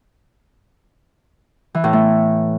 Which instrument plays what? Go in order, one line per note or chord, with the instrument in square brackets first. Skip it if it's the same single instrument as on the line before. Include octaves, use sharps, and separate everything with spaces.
[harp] E3
A2
A3